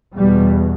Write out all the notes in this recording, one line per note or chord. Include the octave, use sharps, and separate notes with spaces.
E2 B2 G3